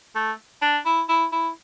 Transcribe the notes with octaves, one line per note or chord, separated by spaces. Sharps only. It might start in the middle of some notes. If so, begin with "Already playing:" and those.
A3
D4
E4
E4
E4